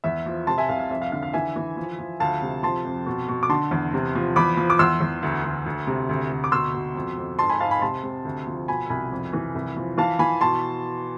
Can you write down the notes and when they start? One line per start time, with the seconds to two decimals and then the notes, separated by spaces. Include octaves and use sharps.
0.04 E2 E5
0.26 F3
0.47 C3 A5 C6
0.58 E5 G#5
0.69 C2 F5
0.79 F5
0.90 F2 E5
1.02 F5
1.12 D3 F5
1.23 F5
1.33 E3 E5 G#5
1.56 E3
1.76 F3
1.99 F3
2.20 D2 F5 A5
2.42 C3
2.63 F3 A5 C6
2.85 F2
3.06 B2
3.28 B2
3.43 D6
3.49 D3 A5 C6
3.71 E2
3.93 C3
4.15 F3
4.36 E2 B5 D6
4.57 F3
4.70 D6
4.79 E2 C6 E6
5.00 E2
5.23 D2
5.44 D2
5.66 D2
5.87 C3
6.09 D2
6.31 D2
6.44 D6
6.52 B2 C6 E6
6.74 B2
6.95 F2
7.18 F2
7.38 G#2 A5 C6
7.49 G#5 B5
7.60 G#2 F5 A5
7.71 G#5 B5
7.82 C3 A5 C6
8.03 C3
8.25 D2
8.47 F3
8.68 B2 G#5 B5
8.90 C2 G#5 B5
9.12 F2
9.33 E3
9.55 C2
9.76 F3
9.98 E3 F5 A5
10.19 E3 G#5 B5
10.41 B2 A5 C6